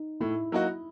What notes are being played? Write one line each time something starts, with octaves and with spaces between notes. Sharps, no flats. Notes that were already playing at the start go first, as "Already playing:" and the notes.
Already playing: D#4
A2 E4
F#3 A#3 D#4 F#4